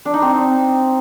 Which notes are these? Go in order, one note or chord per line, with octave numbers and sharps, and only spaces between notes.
D4
D#4
C4